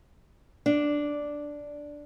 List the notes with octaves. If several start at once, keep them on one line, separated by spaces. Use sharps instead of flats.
D4